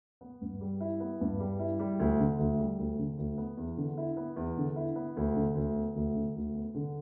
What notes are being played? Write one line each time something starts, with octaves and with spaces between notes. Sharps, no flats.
B3
G2
G3
E4
B3
G2
G3
E4
G3
D2
D3
D2
G3
D2
D3
D2
B3
E2
D3
E4
B3
E2
D3
E4
B3
D2
D3
D2
B3
D2
D3
D2
B3
D3